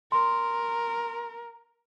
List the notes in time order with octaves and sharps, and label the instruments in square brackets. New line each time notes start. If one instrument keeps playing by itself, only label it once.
[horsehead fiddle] A#4 [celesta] C6